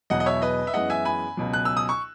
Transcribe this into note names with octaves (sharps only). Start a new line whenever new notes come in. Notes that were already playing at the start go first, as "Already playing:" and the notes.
E1 E2 B2 F#3 D#5 F#5
D#5
C#5 E5
B4 D#5
E5
F#2 E3 G#3 B3 D#5 F#5
E5 G#5
G#5 B5
C#2 B2 F#3
F#6
E6
D#6
C#6